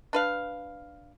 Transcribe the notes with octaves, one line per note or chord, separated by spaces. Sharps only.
D4 B4 F5